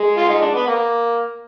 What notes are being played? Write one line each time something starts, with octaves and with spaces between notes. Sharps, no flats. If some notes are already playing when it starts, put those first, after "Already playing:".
Already playing: G#3
F4
D#4
D4
B3
A#3